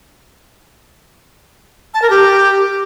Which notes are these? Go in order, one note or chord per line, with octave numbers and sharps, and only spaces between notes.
A5
A#4
G4